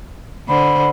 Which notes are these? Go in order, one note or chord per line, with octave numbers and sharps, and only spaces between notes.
D3 C5 B5